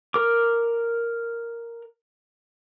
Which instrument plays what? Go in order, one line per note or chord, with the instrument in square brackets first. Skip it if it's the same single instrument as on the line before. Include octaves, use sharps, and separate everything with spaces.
[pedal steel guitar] A#4 D6